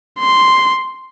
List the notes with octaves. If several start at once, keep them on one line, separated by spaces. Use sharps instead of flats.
C6